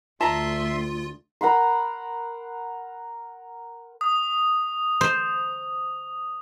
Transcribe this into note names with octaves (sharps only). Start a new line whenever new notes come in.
D2 F4 E5 A5 A#5 C6
A#4 F#5 B5 C6
D#6
C5